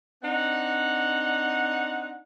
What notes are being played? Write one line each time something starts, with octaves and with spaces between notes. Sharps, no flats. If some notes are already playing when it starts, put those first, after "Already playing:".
C4 D4 D#4 F#5